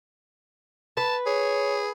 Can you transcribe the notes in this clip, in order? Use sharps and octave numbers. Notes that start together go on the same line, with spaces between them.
B4 A5
G#4 C#5